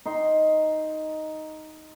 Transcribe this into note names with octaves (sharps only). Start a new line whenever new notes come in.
D#4 C6